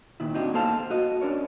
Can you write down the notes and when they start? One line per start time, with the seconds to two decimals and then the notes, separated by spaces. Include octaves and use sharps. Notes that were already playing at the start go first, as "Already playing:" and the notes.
0.20 A#2 D#3 E4
0.34 C4 D4 D#4 F#4 G4
0.54 A#3 A4 C5 F5 A5
0.90 F#4 D#5
1.21 C#4 D4 A#4 C#5